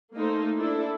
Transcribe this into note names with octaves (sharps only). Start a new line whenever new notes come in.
A3 A#3 D#4 C5
D4 E4 A4